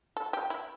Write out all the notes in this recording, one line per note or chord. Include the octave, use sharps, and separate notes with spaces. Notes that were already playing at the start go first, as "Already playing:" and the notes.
A4
G4
E4